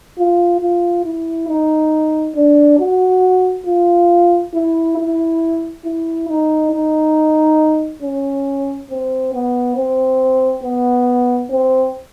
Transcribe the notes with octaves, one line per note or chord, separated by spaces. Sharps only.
F4
F4
E4
D#4
D4
F#4
F4
E4
E4
E4
D#4
D#4
C#4
C4
B3
C4
B3
C4